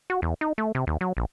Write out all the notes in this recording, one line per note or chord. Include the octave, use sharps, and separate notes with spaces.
F#4
E2
D#4
A3
C3
D#2
F#3
A#1